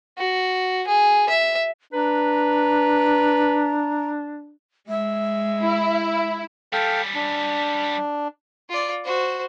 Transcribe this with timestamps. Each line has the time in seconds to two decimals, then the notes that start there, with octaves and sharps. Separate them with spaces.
0.18 F#4
0.88 G#4
1.29 E5
1.93 D4 B4 A#5
4.89 G#3 E5
5.63 E4
6.73 G3 C#4 A4 F5 G5
7.15 D4
8.70 F4 D5
9.05 F#4 C5